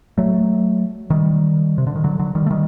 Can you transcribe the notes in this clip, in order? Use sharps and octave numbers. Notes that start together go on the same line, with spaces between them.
F#3 A3
D#3 G3
C3
D3
D#3
D3 F#3
D3 F#3
D#3 G3
A3
D#3 G3